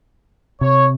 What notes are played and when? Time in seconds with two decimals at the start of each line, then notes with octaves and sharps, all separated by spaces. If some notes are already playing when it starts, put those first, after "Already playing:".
0.61 C3 C#5